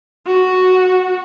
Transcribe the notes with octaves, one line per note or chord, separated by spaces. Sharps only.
F#4